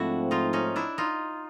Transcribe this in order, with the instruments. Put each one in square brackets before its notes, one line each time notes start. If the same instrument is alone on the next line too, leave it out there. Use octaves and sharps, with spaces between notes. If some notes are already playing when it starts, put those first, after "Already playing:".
Already playing: [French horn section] G#2 F3 A3 C4 [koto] D4 E4 F#4
[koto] D#4 F4
C#4 D#4
D4 E4
D#4 F4